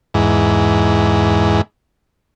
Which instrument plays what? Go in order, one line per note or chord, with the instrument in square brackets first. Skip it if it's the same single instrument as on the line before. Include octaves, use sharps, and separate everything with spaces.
[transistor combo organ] E2 G#2